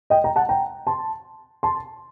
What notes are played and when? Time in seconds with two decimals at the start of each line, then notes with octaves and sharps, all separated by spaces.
0.10 D#5 G5
0.24 G5 A#5
0.36 F#5 A5
0.49 G5 A#5
0.87 A5 C6
1.63 A5 C6